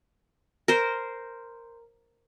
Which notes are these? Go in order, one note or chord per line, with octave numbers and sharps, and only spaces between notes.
A#4 C5